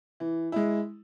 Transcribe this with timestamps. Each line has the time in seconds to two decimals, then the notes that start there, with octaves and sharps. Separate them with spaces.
0.20 E3
0.52 G#3 E4